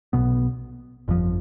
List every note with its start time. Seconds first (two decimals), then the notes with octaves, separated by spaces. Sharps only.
0.13 B1 B2 B3
1.08 G1 F2 C3 F3